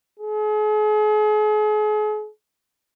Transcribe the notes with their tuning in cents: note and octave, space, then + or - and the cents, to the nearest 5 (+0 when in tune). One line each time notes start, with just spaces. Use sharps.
G#4 +40